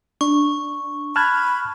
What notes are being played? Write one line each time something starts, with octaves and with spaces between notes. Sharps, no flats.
D4 C#6
A5 B5 F6 F#6 G#6